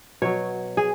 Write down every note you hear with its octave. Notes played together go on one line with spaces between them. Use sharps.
B2 F#3 C#5
G#4